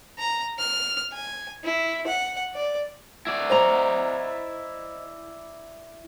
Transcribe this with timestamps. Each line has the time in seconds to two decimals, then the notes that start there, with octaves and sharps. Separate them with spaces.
0.18 A#5
0.58 F6
1.12 G#5
1.64 E4
2.07 F#5
2.54 D5
3.27 E4 D5
3.50 C5 D#5 A#5